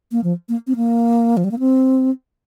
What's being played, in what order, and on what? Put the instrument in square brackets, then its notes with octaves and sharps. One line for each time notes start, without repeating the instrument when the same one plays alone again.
[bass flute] A#3
F3
A#3
C4
A#3
F3
G3
A#3
C4